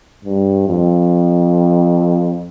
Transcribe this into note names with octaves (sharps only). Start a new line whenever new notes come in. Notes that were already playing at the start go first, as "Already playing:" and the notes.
G2
F2